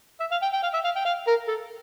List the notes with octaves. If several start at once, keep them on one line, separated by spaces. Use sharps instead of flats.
E5
F5
G5
G5
F5
E5
F5
G5
F5
A#4
A4